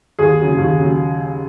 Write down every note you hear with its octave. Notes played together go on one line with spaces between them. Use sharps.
D#2 G#4
C#3 F#3
D#2
C#3 F#3